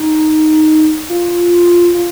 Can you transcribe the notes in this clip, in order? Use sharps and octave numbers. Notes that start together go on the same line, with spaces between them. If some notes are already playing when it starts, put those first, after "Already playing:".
Already playing: D#4
F4
F4